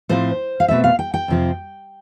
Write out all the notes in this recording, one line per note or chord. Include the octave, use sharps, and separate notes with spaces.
A2 F3 C4 C5
F5
B2 A3 C4 E5
F5
G5
G5
F2 C3 F3 C4